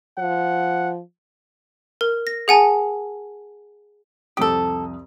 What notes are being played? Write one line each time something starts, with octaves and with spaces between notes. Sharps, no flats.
F3 F#5
A#4
A#6
G#4 F#5 G#5 A5
C2 F2 G4 A4 D#6